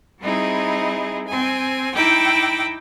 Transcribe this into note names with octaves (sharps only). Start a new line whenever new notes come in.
G3 C4 D#4 E4 G#4
C4 G#5
D#4 E4 G5 D6